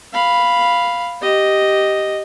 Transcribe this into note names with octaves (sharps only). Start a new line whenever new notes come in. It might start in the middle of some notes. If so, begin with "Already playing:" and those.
F5 B5
G4 D#5